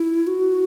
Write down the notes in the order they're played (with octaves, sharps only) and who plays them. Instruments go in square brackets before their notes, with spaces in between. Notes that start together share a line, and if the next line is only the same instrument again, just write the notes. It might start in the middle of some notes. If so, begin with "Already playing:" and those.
Already playing: [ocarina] E4
F#4